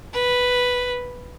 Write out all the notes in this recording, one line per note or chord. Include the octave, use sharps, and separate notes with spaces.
B4